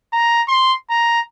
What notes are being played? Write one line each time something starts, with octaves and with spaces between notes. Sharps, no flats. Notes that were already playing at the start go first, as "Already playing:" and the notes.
A#5
C6
A#5